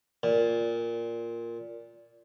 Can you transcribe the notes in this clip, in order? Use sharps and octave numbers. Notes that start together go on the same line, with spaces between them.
A#2